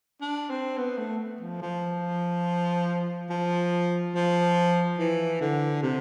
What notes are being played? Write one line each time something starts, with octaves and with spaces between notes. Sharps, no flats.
D4
C4
B3
A3
F3
F3
F3
F3
E3
D3
C3